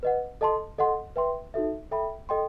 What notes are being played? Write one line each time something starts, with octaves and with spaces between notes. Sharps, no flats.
B4 D#5 F#5
A4 D#5 A5 C6
A4 D#5 F#5 C6
B4 E5 G5 C6
D#4 F#4 A4 E5
A4 E5 G5 B5
A4 D#5 G5 C6